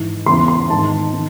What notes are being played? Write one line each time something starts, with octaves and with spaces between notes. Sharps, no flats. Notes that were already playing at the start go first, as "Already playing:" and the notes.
Already playing: G#2 E3
E2 C#3 E3 C6
C6
G#2 D#3 A5
D#3